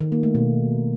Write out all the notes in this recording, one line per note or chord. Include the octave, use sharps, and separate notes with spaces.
D#3
A#3
A3
B2